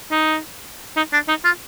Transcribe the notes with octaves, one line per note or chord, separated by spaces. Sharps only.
D#4
D#4
D4
D#4
F4